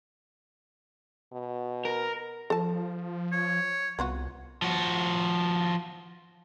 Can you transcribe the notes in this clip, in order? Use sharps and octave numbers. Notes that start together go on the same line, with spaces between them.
B2
A#4
F3 A4 A5
C#5
C2 B3 F4 F#4
F3 F#4